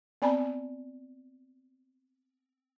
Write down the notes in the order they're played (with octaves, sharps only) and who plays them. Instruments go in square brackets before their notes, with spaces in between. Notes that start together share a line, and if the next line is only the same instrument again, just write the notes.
[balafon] B3 C4 D5 G#5 A#5 B5